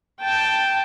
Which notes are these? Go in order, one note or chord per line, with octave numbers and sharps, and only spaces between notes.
G5 A5